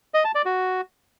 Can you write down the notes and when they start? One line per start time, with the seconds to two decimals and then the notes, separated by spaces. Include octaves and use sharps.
0.14 D#5
0.24 A5
0.35 D5
0.45 F#4